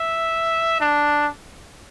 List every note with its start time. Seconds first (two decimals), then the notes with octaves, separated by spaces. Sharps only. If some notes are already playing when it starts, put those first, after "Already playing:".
Already playing: E5
0.80 D4